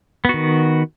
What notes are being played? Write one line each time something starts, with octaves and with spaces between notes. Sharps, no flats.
D#3 B3 F#4